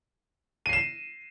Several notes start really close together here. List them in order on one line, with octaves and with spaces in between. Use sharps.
D#7 C7 E7